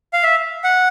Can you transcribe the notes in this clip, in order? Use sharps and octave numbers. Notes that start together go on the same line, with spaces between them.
F5
E5
F#5